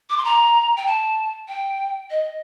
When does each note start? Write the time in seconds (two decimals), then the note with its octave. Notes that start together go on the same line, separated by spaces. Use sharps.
0.10 D6
0.17 C6
0.25 A#5
0.77 G5
0.87 A5
1.48 G5
2.11 D#5